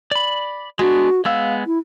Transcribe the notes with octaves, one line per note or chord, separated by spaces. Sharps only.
D5 B5
G#3 B3 D4 F#4
G#3 B3 F5 E6
E4